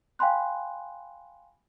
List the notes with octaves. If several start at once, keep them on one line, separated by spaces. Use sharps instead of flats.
F5 G5 G#5 B5 C6 F#6